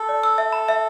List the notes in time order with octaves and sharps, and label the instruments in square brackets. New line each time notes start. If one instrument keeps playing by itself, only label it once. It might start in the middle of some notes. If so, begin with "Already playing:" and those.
Already playing: [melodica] A4
[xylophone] D5
E6
E5
B5
E5